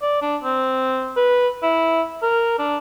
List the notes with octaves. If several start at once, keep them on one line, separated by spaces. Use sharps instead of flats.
D5
D4
C4
B4
E4
A#4
D4